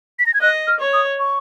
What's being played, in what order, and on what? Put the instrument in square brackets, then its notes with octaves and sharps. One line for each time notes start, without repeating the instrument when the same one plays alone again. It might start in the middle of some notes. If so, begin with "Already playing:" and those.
[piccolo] B6
A#6
G#6
[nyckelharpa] D#5 [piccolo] F#6
[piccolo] F6
[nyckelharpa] C#5
[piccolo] D#6
C#6